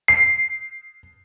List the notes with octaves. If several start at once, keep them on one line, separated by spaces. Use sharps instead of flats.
C7